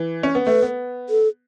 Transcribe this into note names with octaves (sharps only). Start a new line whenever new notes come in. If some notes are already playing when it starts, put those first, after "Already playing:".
Already playing: E3
C#4
B3
A3 B4
B3
A4